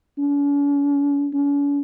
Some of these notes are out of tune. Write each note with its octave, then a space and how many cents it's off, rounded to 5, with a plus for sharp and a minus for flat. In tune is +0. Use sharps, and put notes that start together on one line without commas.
C#4 +45
C#4 +45